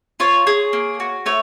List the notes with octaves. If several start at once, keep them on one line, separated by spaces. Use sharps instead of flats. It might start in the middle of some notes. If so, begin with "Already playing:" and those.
F4 C#5
G#4
A#3
F#4
A3 C#5